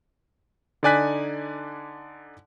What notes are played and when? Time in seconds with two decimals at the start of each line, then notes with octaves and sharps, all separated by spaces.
0.83 D3 D#4 D5 G#5 F#6 B6